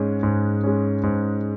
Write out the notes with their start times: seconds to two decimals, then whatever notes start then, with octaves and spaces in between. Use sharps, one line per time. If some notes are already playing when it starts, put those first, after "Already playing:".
Already playing: G#2 G#3 C#4
0.23 G#2
0.64 G#3 C#4
1.03 G#2